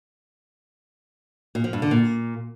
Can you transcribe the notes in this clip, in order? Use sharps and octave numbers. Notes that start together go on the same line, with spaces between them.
A#2
F3
G2
D3
A#2